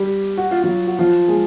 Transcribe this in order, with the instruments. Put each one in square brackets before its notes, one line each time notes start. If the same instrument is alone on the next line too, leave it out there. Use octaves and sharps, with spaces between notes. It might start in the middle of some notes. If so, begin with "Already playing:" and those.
Already playing: [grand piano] G3 G4
F#4
F4
F#3 F#4
F#4
F3 F4
G#3 G#4